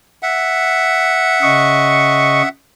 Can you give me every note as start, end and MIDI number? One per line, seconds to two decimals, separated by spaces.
0.23 2.49 76
0.23 2.49 78
1.42 2.42 49
1.42 2.42 75
1.42 2.42 85